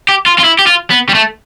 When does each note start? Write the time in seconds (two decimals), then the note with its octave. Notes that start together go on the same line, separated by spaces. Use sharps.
0.09 G4
0.26 F4
0.39 F4
0.44 E4
0.59 G4
0.67 F4
0.90 B3
1.09 G3
1.14 A3